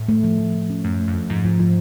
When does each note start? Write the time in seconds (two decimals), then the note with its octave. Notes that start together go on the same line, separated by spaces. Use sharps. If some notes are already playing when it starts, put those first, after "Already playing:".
Already playing: A2
0.09 A3
0.24 F3
0.38 F3
0.55 F3
0.70 C#4
0.84 F#2 A3
1.00 A3
1.07 F2
1.14 F3
1.30 G#2 F3
1.45 F3
1.60 F3